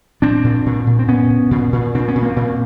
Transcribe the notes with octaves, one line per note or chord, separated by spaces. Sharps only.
A#2 C4 D4
A#2
A#2
A#2
C4
A#2 B3 C#4
A#2
A#2
A#2
A#2 C4 D4
B3 C#4
A#2
A#3 C4
A#2